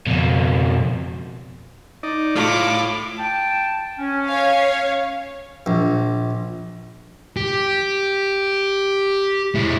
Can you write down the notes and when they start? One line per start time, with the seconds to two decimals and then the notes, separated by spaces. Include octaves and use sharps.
0.06 F2 B2
2.03 D#4 D5
2.36 A2 F4 D6
3.17 G5 A5
3.99 C#4
4.28 C#5 F5
5.66 A#1
7.37 G4
9.55 G#3 E4